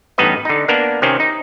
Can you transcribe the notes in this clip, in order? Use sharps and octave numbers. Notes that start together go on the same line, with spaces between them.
A1 G2 B3 D#4 B4 D#5
D3 D#4
A#3 B3 D4 A#4
C3 D#3 C4 C#4
D#4